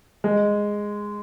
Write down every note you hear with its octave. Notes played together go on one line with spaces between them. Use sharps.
G#3